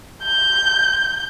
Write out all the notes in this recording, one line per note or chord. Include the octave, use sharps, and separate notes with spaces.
G6